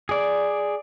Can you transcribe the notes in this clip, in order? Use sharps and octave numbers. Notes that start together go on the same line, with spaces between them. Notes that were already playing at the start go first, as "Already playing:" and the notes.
G#4 D5